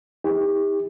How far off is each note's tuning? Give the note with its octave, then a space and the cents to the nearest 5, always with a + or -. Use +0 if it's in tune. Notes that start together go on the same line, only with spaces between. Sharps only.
D#4 +45 G4 +35